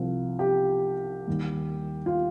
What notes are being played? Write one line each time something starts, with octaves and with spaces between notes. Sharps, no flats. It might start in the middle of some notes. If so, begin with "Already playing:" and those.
Already playing: C2 C3 F3
G4
D#2 D#3 G3
F4